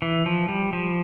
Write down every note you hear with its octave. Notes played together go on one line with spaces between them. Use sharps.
E3
F3
G3
F3